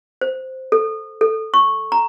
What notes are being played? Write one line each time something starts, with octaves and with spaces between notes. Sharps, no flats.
C5
A4
A4
C#6
A#5